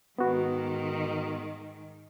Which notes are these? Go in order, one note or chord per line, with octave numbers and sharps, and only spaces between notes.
G#2 D#3 B3 F#4